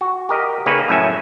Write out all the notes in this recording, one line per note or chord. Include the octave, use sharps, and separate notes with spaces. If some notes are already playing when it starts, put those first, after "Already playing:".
F#4
G4 A#4 D#5
C#3 A#3 C#4 D#4 B4 C#5
F#2 A2 F#3 C#4 E5 G#5